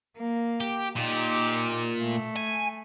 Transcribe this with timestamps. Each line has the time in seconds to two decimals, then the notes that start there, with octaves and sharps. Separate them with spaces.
0.17 A#3
0.61 G4
0.96 A#2 D#4 G4
2.00 A3
2.36 G#5